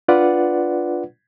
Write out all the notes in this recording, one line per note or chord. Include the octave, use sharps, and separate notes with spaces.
D4 F4 B4 D5 F#5